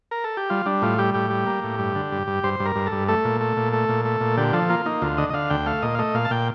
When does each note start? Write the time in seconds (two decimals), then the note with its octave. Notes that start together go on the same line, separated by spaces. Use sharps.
0.11 A#4
0.24 A4
0.37 G4
0.50 G3 F4
0.66 G3 D4
0.82 A2 F4
0.98 G3 G4
1.14 A2 G4
1.30 G3
1.46 A#3
1.64 A2
1.79 G2
1.95 D3
2.12 G2
2.27 G2
2.44 G2 C5
2.60 G2
2.65 A#4
2.76 G2
2.86 A4
2.92 G2
3.08 A3 A4
3.24 A#2
3.41 A3
3.57 A#2
3.73 A3
3.89 A#2
4.05 A3
4.21 A#2
4.37 D3 G4
4.53 F3 A4
4.69 A#3 F4
4.86 A#3 D#4
5.02 D2 F4
5.18 D3 D#5
5.30 D#5
5.34 D3 F5
5.50 D2 G5
5.66 A3 F5
5.82 A#2 D#5
5.95 F5
5.99 A3 D#5
6.14 A#2 F5
6.25 A5
6.30 A#2 G5